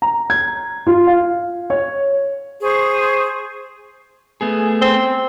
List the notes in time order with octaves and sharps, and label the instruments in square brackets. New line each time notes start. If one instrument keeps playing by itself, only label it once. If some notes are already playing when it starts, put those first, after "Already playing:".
[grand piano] A#5
G#6
F4
F5
C#5
[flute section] G#4 C5 C#6
[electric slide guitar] A3 B3 G#4
[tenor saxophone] C4